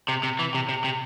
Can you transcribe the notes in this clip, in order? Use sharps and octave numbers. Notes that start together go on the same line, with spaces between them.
C3
C3
E3
C3
C3
C3